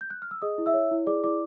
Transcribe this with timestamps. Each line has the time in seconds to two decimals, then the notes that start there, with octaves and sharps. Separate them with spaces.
0.01 G6
0.10 F#6
0.22 F6
0.31 E6
0.42 G#4 D#5 D#6
0.58 E4
0.66 E5 E6
0.74 C#5
0.91 E4
1.07 G#4 D5 D6
1.24 E4 D5 D6